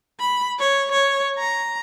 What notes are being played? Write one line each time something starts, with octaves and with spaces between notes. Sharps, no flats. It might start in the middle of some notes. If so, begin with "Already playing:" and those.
B5
C#5
C#5
A#5